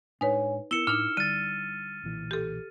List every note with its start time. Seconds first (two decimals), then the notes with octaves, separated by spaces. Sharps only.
0.21 A2 G#3 D4 D#4 B4 C#5 G#5
0.71 B3 E4 A#4 E6 C#7 E7 G7
0.87 A2 D4 D#4 F6
1.17 D3 G3 A6 D#7
2.03 B1 A#2 E3
2.31 G4 A4